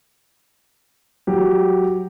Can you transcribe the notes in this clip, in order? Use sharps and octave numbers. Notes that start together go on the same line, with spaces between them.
F#3 G4